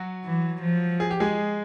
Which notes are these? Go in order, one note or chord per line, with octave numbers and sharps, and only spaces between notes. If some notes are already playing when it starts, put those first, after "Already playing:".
Already playing: F#3 F#4
E3
F3
G#4
G4
G#3 G#4